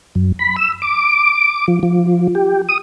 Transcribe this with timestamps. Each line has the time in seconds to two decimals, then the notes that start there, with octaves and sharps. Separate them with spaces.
0.15 F#2
0.39 B5
0.56 E6
0.82 D6
1.68 F3
1.83 F3
2.35 G4
2.69 D#6